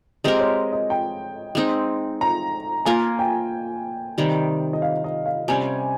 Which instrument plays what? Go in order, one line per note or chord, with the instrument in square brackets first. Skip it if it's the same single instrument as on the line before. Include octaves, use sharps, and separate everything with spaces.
[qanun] G#3 C4 G4 A#4 [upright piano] D#5
[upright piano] C#5
D#5
G5
[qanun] G#3 C4 D#4
[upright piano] A#5
[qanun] A#3 F4 A#4 [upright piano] G#5
[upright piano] G5
[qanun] C3 D#3 G3
[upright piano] D#5
F5
D#5
F5
[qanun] C3 G3 C#4 [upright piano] G#5